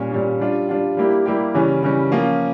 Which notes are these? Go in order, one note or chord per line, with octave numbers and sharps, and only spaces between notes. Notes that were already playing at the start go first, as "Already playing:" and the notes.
Already playing: A#2 G3 C#4
A#2 G3 C#4
G3 D4 F4
G3 D4 F4
G3 A#3 E4 G4
G3 A#3 E4 G4
C#3 E3 G3 C#4
C#3 E3 G3 C#4
F3 A#3 C#4 F4